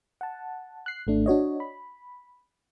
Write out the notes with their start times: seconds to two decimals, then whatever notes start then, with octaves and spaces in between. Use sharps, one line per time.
0.21 F#5 A5
0.86 F#6 C7
1.07 G#1 A3 D4
1.26 D4 F#4 C#5 D#5
1.60 B5